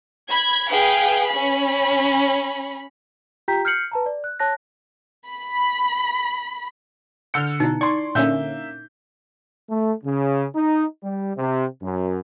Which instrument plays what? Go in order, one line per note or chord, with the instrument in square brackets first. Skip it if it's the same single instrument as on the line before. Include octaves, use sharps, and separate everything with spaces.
[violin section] B5 G#6
G#4 B4 F5 G5
C#4 B5
[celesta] F4 G4 G5 A#5 G6 B6
F6 G6 C7 C#7 F#7
B4 A5 A#5
D5
F#6
C#5 A5 F#6 A#6
[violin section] B5
[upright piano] D3 C#7 [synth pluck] F6 G6
[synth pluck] B2 [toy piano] D#4 E4
[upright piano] D5 C6 [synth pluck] C#6 G#6
[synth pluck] A#2 D3 C#4 [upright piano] A#3 E5 G6
[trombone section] A3
C#3
D#4
G3
C3
F#2